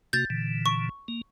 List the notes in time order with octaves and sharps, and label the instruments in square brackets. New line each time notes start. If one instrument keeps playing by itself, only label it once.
[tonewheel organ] C3 A#3 F#4 [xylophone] G6 A6
[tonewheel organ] A#2 D3 E3
[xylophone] C#6
[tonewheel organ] A#3